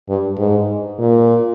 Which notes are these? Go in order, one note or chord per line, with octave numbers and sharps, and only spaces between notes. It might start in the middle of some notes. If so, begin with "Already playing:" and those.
G2
G#2
A#2